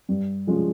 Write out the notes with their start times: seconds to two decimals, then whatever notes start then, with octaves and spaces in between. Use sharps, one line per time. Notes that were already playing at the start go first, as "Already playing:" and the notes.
0.09 G2
0.47 F3 G#3 C#4 F4